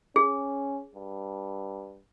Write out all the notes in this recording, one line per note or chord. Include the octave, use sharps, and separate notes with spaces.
C#4 G#4
G2